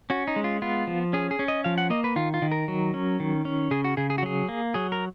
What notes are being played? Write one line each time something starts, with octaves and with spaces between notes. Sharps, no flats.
C#4 F#4
D#4
G#3
F4
B3 F4
F3
C#4 G#4
G#4
C#4
D#5
F3 F5
F#5
A#3 D#5
B4
D#3 F4
F4
D#3
A#4
F#3
C#4
D#3
C#4
C#3 G#4
F#4
C#3 G#4
G#4
F#4
F#3 G#4
A#3
F#3 G#4
A#4